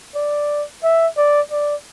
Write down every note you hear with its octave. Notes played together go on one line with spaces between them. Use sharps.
D5
E5
D5
D5